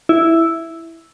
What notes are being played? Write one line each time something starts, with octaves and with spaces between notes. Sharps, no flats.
E4